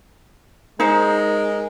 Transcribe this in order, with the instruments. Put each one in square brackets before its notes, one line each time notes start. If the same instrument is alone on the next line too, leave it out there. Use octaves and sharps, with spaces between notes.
[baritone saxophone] G#3 [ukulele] D#4 C5 [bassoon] A#4